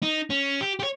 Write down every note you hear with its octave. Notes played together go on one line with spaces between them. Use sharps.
D#4
C#4
G4
G4 C#5